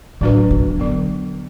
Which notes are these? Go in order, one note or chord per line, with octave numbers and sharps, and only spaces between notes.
A2 F#3 A3 D4 F#4 B4
B2
D3 F#3 B3